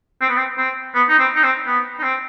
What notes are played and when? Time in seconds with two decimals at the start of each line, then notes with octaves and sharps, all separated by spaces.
0.21 C4
0.29 B3
0.37 C4
0.58 C4
0.95 B3
1.09 D#4
1.19 C4
1.36 D#4
1.43 C4
1.67 B3
1.99 D#4
2.03 C4